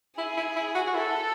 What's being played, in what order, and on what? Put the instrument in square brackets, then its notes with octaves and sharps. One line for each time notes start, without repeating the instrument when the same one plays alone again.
[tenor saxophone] E4 [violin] G#4
[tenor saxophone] E4
E4
F#4
F#4
[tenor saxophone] E4 [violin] A4